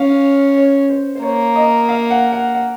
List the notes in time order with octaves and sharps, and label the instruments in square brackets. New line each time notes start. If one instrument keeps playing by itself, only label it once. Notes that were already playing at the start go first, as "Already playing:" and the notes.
Already playing: [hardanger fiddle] C#4 [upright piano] F5
[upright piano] C#5
C5
C5
[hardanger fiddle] A#3 [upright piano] C#5
[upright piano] D#5
F5
F#5
F#5
F#5